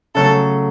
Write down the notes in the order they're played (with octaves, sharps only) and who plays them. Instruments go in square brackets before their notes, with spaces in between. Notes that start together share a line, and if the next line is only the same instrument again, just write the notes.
[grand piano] C#3 F#3 A3 [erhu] A4